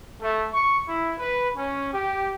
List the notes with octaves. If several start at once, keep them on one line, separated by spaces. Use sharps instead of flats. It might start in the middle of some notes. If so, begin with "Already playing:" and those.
A3
C#6
E4
B4
C#4
G4